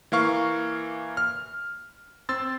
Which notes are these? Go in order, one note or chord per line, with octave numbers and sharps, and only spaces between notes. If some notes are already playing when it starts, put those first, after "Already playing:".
E3 A#3 F5 C#6 F6
F6
C4 C6 E6 A6